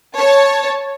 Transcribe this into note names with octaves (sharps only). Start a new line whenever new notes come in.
C#5 A5